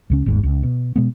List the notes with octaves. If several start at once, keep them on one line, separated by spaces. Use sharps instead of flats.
C#2 C#3 C#4
G1 D#2 G#2
C#2
B2
B2 G#3 B3